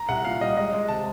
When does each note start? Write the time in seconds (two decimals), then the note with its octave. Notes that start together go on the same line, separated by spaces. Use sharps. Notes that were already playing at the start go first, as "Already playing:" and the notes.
Already playing: A#5
0.09 C2 F#5
0.25 A#2 F5
0.41 G3 D#5
0.57 G#3 D#5
0.73 G#3
0.89 C3 A5